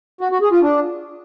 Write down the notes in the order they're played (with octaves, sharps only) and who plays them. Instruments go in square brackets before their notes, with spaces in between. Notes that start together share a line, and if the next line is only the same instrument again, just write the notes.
[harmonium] F#4
F#4
G#4
F4
D4